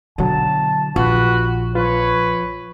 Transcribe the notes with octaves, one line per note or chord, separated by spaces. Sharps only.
B2 D3 F#3 A5
A#1 F4 F#4 B4
F3 F4 B4 C#5